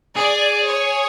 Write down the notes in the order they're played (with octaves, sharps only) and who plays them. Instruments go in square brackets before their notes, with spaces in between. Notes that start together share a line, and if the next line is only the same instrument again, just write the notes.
[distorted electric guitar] G#4 [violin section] D5
[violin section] C#5